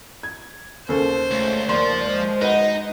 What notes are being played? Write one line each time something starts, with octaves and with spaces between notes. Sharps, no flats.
G#6
D#2 C#3 A4 C5
C#2 A3
D#2 F3 D5 C6
G#3 C5
D#4 F#4 B4 D#5